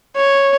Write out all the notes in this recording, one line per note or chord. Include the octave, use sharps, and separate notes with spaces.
C#5